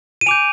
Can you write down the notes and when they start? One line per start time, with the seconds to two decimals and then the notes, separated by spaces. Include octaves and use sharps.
0.21 D#7
0.26 G#5 D6 G6 D7 F7